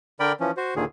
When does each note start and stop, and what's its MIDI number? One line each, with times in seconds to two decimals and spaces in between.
0.20 0.32 50
0.20 0.32 70
0.20 0.32 74
0.20 0.32 79
0.20 0.32 83
0.40 0.51 52
0.40 0.51 53
0.40 0.51 61
0.57 0.74 66
0.57 0.74 72
0.76 0.85 39
0.76 0.85 46
0.76 0.85 50
0.76 0.85 51
0.76 0.85 68